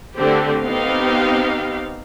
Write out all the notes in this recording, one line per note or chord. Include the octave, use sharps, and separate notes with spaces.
D3 A3 C4 G4
B3 C4 D#4 G4 F5